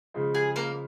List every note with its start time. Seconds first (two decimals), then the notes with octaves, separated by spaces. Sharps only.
0.14 C#3 F3 G#3
0.35 G#4
0.56 A#3 A#4